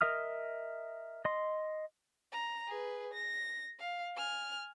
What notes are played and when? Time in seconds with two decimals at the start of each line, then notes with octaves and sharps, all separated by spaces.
0.01 A#4 D#5 E5 D#6 F6
1.25 D#5 C6
2.32 A#5
2.68 G#4 B4
3.13 A#6
3.80 F5
4.17 G#5 F6